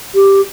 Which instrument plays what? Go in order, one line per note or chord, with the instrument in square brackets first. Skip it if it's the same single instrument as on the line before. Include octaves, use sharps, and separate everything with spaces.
[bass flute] G4